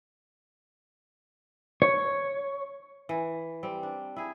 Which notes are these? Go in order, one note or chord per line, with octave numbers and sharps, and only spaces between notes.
C#5
E3
G3 C4
D4
E4 G#4